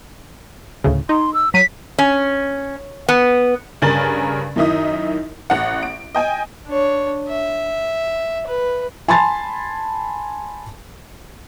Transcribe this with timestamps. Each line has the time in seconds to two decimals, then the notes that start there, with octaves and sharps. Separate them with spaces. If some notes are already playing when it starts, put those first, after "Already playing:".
0.84 D2 A2 C#3
1.09 D#4 C6
1.34 E6
1.54 F#3 B6 D#7
1.99 C#4
3.09 B3
3.82 G2 C#3 A#4 G#5 A6 F#7
4.56 F#2 D#3 D#4 E4 D#6
5.50 A1 F#5
5.83 D7
6.15 D#5 G5 G#5
6.67 D4 C#5
7.28 E5
8.47 B4
9.08 G#5 A5 B5 C6 A6